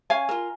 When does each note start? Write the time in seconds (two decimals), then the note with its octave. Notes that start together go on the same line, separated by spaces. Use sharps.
0.10 C#4 F5 G#5
0.29 F4 A#4